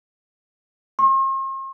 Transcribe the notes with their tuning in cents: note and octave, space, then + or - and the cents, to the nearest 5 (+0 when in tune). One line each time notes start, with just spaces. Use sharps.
C6 +45